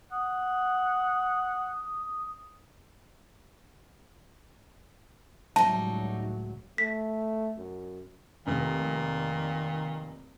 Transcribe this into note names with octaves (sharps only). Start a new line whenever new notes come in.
F#5 D#6
C#2 A2 F#3 G3 D#4 A5
A3 B6
F#2
F1 A#2 D#3